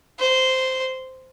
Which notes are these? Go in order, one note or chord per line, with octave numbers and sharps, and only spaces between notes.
C5